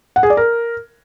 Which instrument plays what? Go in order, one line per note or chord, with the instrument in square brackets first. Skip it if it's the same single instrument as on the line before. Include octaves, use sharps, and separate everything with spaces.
[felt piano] F#5
G#4
D5
A#4